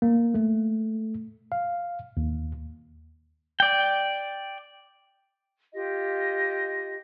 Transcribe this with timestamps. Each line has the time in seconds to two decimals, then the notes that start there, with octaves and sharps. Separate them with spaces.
0.02 A#3
0.34 A3
1.52 F5
2.17 D#2
3.60 D5 G5
5.73 F4 G4 D#5